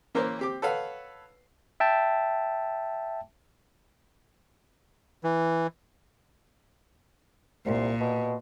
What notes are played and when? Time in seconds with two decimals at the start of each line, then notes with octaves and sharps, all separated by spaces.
0.15 E3 A#3 C#4 A#4 C5
0.39 C4 G4 D6
0.62 A4 B4 C#5 F5 F#5
1.80 E5 G5 A5
5.24 E3
7.66 C2 A#2
8.00 B2